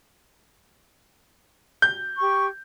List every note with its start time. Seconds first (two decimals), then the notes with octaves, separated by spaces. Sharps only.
1.82 G6
2.18 G4 C#6